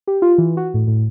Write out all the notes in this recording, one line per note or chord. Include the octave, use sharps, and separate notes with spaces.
G4
F4
E3
F#4
A2
A2